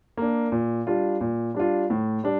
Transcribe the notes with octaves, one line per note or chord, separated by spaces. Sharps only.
A#3 D4
A#2
G3 D4 F4
A#2
G3 D4 F4
A2
G3 D4